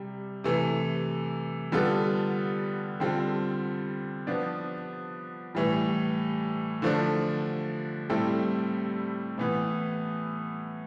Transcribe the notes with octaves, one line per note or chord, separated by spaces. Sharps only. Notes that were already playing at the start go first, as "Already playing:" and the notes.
Already playing: C3 G3
C3 E3 A3
D3 G3 B3 F4 A4
D3 G3 C4 F4 A4
F3 B3 D4
A2 E3 G3
D3 F3 A3 D4
A2 G3 C4 E4 A4
A2 E3 B3